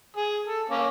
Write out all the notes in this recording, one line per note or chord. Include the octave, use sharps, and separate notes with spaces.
G#4
A4
A#3 C#4